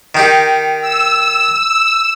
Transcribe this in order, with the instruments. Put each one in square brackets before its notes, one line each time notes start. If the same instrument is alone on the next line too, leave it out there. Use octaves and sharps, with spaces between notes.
[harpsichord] D#3 D#4 G4
[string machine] E6